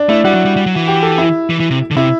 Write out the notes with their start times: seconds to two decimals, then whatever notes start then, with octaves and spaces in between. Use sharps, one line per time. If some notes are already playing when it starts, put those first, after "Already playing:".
Already playing: D4
0.09 A3 E4
0.25 G3 F#4
0.34 F#3
0.45 G3
0.56 G3
0.66 F#3
0.76 E3
0.88 G4
1.03 A4
1.18 E4
1.50 E3
1.60 E3
1.70 C3
1.91 D3
1.96 C3 E4